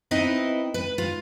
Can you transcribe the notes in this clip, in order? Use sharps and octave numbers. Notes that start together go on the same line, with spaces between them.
C4 D#4 E4 B4 D#5
B4
F4